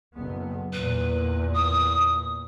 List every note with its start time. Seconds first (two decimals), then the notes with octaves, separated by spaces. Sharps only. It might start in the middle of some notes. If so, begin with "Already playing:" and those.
0.14 F#1 B3
0.73 E2 A#2 B4
1.54 D#6